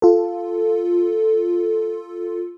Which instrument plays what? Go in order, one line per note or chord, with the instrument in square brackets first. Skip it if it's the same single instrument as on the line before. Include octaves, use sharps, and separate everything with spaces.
[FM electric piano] F4 A4